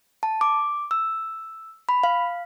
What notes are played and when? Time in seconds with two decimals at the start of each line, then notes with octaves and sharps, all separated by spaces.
0.23 A5
0.41 D6
0.91 E6
1.89 B5
2.04 F5